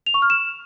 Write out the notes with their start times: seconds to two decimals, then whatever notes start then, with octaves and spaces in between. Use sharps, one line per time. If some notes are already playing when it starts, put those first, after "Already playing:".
0.06 F7
0.14 C#6
0.22 F6
0.30 E7